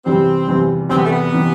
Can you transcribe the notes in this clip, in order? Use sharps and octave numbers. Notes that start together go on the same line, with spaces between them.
E2 C3 E3 G3 C4
E2 C3 E3 G3
E2 C3 E3 G3 C4
B3
A3
B3
C3 E3 G3